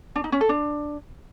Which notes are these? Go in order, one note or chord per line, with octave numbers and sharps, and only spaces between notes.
D4
D#4
C#4
A4
D4